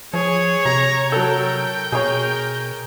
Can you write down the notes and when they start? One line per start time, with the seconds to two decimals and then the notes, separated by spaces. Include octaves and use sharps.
0.14 F3 G#4 C#5
0.65 C3 A#5
1.12 F#3 A4 A#4 G5
1.92 B2 G#4 A#4 C#5